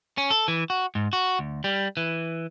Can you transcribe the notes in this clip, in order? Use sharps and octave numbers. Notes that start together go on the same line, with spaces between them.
C#4
A4
E3
F#4
G#2
F#4
D2
G3
E3